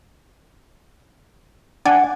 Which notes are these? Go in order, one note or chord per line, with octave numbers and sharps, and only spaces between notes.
D4 D5 F#5 G#5